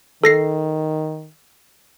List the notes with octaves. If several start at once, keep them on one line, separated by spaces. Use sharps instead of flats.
D#3 A4 A#6 C7